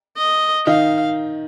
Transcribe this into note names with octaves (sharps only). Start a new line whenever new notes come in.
D#5
D#3 D#4 F5